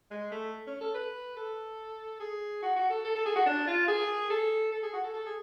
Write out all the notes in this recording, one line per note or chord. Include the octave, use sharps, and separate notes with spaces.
G#3
A3
C#4
A4
B4
A4
G#4
F#4
F#4
A4
A4
A4
G#4
F#4
D4
F4
G#4
A4
A4
G#4
F#4
A4
A4
G#4